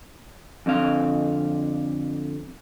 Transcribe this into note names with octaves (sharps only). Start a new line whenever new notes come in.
F2 D3 C4 F5